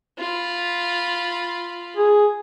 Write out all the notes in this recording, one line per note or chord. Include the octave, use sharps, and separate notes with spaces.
F4 B5
G#4